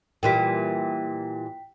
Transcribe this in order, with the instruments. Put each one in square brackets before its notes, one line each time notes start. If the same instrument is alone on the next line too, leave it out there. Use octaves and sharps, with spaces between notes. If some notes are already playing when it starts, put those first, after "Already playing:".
[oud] A#2 E3 G3 [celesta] G5 B6